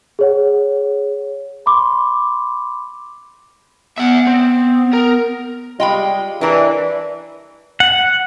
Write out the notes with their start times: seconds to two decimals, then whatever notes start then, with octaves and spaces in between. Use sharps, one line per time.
0.19 G#4 C#5 F#5
1.66 B5 C6 D6
3.98 B3 E5 F#5
4.27 C4
4.94 A#4
5.80 G3 G#3 F4 D#5 G5 B5
6.41 E3 D4 A#4
7.80 F#5